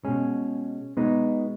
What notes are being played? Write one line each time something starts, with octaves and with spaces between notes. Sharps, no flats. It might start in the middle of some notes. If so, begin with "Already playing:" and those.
B2 G#3 C#4
B2 G#3 B3 D#4